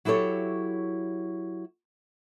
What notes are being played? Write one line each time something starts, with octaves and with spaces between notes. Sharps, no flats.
F#3 E4 G4 A4 C#5